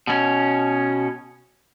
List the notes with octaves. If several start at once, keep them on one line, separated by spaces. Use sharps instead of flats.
B2 C#4